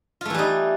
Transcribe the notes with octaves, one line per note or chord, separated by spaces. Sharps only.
E3 G3 A3 D#4 F4